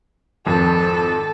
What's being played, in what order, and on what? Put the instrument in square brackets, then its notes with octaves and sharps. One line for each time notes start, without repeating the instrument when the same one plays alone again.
[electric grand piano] G#1 F2 [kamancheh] A4